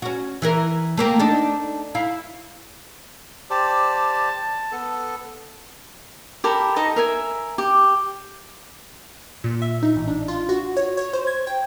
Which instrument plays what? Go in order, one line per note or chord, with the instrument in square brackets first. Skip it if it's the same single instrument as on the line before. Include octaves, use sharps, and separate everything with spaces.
[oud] C#4 F#4
E3 E4 A#4
A3 A#3 C4
D4 D#4 A4
E4 F5
[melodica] G4 C5 D5 [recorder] A5
[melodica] B3 A4
[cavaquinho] G4 A4 A#4 B5
D#4 A4 D#5 A#5
A#4 E5 G#5
G4
[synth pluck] A#2
E5
D#4
A1
D4
F4
F#4
C#5
C#5
C5
G#6
G5